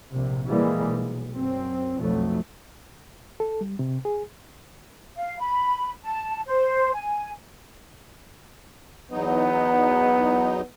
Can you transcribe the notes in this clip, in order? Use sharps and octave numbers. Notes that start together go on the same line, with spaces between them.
A#1 C3
A#2 E3 G3 G#3 A#3
B1
F#2 C4
B1 F2 F#3 A3
A4
G3
C3
G#4
F5
B5
A5
C5
G#5
E2 F#3 B3 D#4